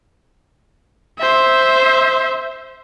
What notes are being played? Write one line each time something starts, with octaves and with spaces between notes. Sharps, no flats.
C5 E5